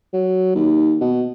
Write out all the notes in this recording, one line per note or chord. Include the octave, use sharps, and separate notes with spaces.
F#3
D#2
B2